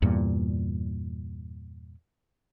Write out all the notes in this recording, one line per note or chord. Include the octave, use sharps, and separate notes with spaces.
E2 G2 A#2